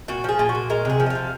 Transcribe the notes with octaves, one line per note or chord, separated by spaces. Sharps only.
A#2 F#4
F3 G#4
A#2
F#4
A#2
G#3 A#4
C3 G#4
F3
D#5
C3 F5